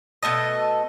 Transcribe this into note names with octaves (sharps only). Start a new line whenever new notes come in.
B2 A3 A4 D#5